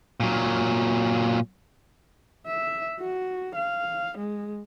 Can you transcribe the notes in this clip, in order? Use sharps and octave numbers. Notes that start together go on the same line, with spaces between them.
A#2 F#3
E5
F#4
F5
G#3